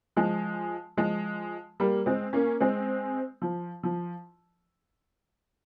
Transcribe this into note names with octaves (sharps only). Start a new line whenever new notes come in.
F3 G#3
F3 G#3
G3 A#3
G#3 C4
A#3 C#4
G#3 C4
F3
F3